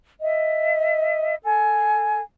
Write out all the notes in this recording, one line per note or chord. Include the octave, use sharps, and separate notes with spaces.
D#5 E5
A4 G#5